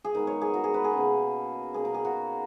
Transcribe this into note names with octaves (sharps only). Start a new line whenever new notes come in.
G#4
D#3 G#3 B3 D#4 A#4
C#5
G#4
F#4
G#4
B4
G#4
B2 A#3 C#4
B2 A#3 C#4 G#4
A#4
G#4
F#4